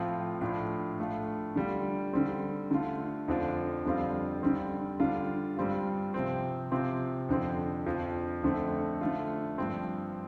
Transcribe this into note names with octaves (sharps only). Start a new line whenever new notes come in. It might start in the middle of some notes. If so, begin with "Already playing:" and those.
Already playing: A2 F3 C4 F4
A2 F3 D4 F4
A2 A3 D4 F4
D3 G3 F4
D3 G3 C4
D3 A3 F4
F2 D3 F3 D4 F4
F2 D3 G3 C4 F4
D3 G3 C4
D3 G3 D4 F4
G2 G3 C4 F4
C3 F3 C4
C3 F3 C4 F4
F2 D3 F3 C4
F2 F3 D4 F4
F2 D3 A3 C4
D3 A3 F4
G2 F3 C4